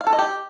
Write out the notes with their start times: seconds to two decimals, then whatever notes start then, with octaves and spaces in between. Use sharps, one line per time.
0.01 F5
0.07 A4
0.13 D#5
0.19 G4